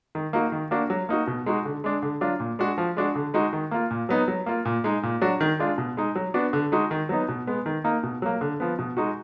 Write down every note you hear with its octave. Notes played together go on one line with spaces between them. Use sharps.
D#3
A#3 D#4 F#4
D#3
A#3 D4 F#4
F#3
A#3 D#4 F#4
B2
G#3 D#4 F#4
D3
G#3 D4
D3
F#3 D4 F4
A#2
G#3 D4 F#4
F3
G#3 D4 F#4
D3
G#3 D#4 F#4
D#3
A#3 F4
A#2
F#3 B3 D#4
F#3
A#3 F4
A#2
G#3 D#4
A#2
F#3 D4 F#4
D#3
G#3 D4 F4
B2
G#3 D#4
F#3
B3 D4 F#4
D3
G#3 D#4 F#4
D#3
F#3 B3 D#4
B2
G#3 B3
D#3
A#3 D#4
B2
F#3 A#3
D3
F3 B3
B2
G#3 D#4 F#4